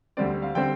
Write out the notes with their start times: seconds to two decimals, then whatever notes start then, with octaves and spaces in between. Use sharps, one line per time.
0.17 D2 D3 G3 C4 D5
0.42 F5
0.55 D3 G3 C4 G5